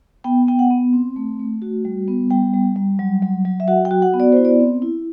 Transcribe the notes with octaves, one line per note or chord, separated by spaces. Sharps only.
B3 G5
B3 G5
F#5
B3
C4
A3
A3
F#4
G3
B3
G3 G5
G3
G3
F#3
F#3
F#3
E5
F#4 F#5
G5
F#4
F#5
B3
D5
E4 C5
D5
C4
E4